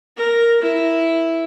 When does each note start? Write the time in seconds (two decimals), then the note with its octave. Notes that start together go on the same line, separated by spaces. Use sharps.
0.17 A#4
0.62 E4